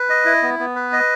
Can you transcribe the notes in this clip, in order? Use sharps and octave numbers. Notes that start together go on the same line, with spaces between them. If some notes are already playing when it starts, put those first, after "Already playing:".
Already playing: B4
D#5
E4
B3
B3
B4
D#5